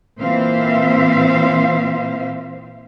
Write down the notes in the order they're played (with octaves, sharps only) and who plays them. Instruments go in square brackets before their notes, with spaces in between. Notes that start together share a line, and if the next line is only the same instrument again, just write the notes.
[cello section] A#2 E3 C4 C5 E5 F5